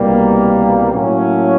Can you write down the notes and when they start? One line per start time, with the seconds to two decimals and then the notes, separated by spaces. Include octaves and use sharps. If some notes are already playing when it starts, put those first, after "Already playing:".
Already playing: C2 B2 G3 A#3
0.92 A2 F#3 A#3 C#4